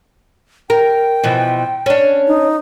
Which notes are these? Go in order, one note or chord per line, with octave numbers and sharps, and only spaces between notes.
A#4 G5
B2 E3 F3
C#4 D4
D#4